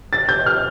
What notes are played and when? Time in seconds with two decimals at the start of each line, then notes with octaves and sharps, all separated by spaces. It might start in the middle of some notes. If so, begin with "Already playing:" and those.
0.13 A6
0.29 G6
0.46 F6